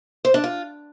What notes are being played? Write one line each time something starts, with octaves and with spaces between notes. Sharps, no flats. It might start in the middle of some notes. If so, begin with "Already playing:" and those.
C5
D4
F4